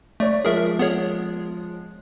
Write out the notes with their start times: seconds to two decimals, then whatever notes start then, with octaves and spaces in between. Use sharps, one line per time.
0.20 A3 C#5 D5
0.45 F3 G#3 G#4 A#4 E5
0.79 B3 G#4 C#5